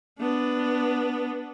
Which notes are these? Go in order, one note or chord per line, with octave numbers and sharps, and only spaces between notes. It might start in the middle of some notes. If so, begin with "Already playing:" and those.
B3 D4